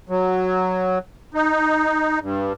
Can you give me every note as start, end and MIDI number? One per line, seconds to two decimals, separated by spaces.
0.09 0.99 54
1.34 2.19 63
2.21 2.53 43